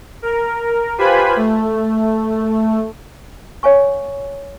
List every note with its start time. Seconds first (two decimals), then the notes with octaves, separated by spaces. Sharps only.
0.22 A#4
0.98 F4 G4 B4 C5 G#5 B5
1.36 A3
3.63 C#5 F5 G#5 C#6